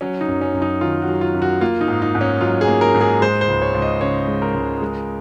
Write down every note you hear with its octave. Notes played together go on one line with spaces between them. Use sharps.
F#3 C#4
D#4
F#2
C#4
F#2
D#4
D#3 F4
F#4
F#3
F4
F#2
F#4
A#3 F4
D#4
G#2
D#4
G#2
C#4
F#3 F4
G#4
A#3
A#4
G#2
G#4
G#3 C5
C5
C#2
C#5
C#2
D#5
C#3 C#5
G#3
A#4
C#2
G#3